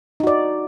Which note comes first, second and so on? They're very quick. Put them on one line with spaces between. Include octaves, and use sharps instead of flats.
D#4 F#4 D5